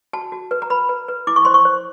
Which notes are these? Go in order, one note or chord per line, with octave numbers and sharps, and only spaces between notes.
F#4 A5
F#4
B4
A#5
B4 B5
B4
B4
E4 D6
C#6
C5 C6
C#6
C5